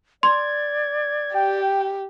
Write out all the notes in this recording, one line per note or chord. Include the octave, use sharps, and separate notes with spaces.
D5 C6 G#6
G4 G5